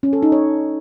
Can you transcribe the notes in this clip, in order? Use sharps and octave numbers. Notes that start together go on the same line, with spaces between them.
C#4
A4
D#4
C#5